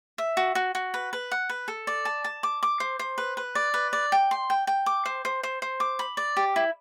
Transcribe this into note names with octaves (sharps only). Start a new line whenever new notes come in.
E5
F#4
F#4
F#4
B4
B4
F#5
B4
A4
D5
A5
A5
D6
D6
C5
C5
B4
B4
D5
B4
D5
G5
C6
G5
G5
D6
C5
C5
C5
C5
D6
B5
D5
G4
E4